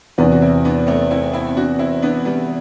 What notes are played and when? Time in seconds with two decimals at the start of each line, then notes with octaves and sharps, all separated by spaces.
0.18 E2 C3 E3 B3 D4
0.32 F#4
0.42 C4 E4
0.65 B3 D4
0.87 A3 C4
1.11 C4 E4
1.33 C4 E4
1.57 D4 F#4
1.79 C4 E4
2.02 B3 D4
2.25 G3 B3